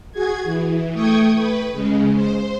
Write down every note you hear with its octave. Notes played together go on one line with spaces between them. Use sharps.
F#4 G#4 G#6
E3
A3 G5 C#6 D#6 G#6
B4
C#3 G#3
C5